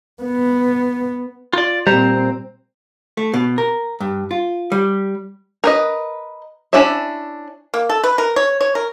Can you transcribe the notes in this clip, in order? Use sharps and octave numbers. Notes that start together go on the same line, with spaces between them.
B3
F4 D5
A#2 G3 C4 C5 A#5
A3
B2
A#4
G2
F4
G3
A#4 B4 D#5
C#4 D4 E4 D5 E5
A#3
A4
B4
A#4
C#5
C#5
A#4